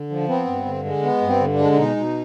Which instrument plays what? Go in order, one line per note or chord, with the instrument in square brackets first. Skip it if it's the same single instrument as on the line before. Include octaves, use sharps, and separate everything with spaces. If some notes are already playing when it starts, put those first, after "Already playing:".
Already playing: [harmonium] D3
F3
B3 C4
G2
D3
G#3
B3
G2
C4
D3
D4
G#3
D4
B2 D#4
B2